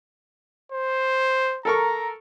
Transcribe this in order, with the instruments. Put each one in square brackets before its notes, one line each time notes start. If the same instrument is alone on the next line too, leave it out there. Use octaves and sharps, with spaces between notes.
[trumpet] C5
[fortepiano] A4 A#4 C#6 [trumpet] A#5